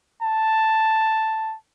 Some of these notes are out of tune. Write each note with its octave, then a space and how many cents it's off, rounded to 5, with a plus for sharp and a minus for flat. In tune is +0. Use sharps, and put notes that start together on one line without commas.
A5 +5